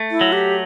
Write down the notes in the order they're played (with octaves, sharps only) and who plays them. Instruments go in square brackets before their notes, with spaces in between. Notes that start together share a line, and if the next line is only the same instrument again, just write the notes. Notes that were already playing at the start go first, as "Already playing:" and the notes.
Already playing: [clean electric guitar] A3
[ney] E4
[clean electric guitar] F#3
[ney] G4